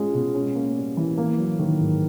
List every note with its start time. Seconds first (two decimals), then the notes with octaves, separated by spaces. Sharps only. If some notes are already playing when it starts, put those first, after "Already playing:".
Already playing: G#3 C#4 F4
0.14 B2
0.35 C#4
0.55 A#3
0.76 G3
0.97 E3
1.18 A#3
1.38 F#3
1.59 D#3
1.80 G#2